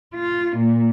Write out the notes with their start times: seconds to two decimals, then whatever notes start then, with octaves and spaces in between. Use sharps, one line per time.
0.14 F4
0.56 A#2